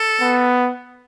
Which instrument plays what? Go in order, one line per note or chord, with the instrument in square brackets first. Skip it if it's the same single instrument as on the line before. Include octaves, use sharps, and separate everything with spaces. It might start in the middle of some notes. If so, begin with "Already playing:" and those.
Already playing: [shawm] A4
[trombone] B3